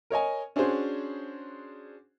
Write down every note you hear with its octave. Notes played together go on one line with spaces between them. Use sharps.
A#4 C#5 D#5 G#5
C#4 D4 F#4 G#4 C5